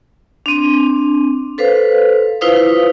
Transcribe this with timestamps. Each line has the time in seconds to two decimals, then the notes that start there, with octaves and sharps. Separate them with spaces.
0.46 C4 D4
1.58 A4 B4 C5 F5
2.41 E4 F4 B4 C5 F5 D#6